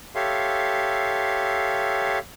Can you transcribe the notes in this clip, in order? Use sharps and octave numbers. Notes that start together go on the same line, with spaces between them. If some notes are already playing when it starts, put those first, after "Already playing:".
G4 A4 C#5 E5 F5 C6